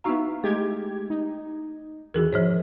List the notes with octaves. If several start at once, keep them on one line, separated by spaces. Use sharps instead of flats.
B3 D#4 E4 F#4 F5 A#5
G#3 A3 G4 G#6
D#4
E2 D#3 E3 F#4 G#4 A#4
G#2 F3 C5 C#5